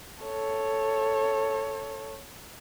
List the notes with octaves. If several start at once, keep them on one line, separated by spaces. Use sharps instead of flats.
A4 C#5